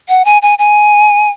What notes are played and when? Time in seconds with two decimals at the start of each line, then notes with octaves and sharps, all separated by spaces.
0.09 F#5
0.25 G#5
0.42 G#5
0.59 G#5